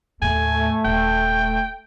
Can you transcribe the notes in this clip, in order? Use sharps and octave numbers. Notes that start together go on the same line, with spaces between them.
D#2 A2 A3 G#5
D#1 G5